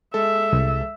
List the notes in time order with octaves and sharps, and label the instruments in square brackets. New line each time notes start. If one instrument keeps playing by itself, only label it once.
[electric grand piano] G#3 A4 [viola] E5
[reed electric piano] C2